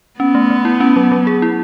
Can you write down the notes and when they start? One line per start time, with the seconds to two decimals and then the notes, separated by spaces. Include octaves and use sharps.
0.19 B3 C#4
0.35 A3
0.50 A3
0.65 E4
0.80 C#4
0.96 F#3
1.12 F#3
1.27 G#4
1.42 E4